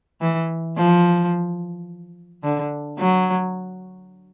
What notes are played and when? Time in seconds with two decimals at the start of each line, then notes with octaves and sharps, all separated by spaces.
0.21 E3
0.77 F3
2.43 D3
2.99 F#3